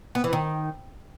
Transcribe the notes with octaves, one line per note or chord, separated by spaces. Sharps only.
B3
E3
D#3